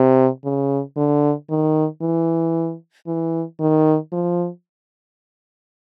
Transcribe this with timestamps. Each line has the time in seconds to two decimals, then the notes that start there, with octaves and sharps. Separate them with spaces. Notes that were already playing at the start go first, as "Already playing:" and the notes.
Already playing: C3
0.45 C#3
0.97 D3
1.50 D#3
2.01 E3
3.07 E3
3.60 D#3
4.12 F3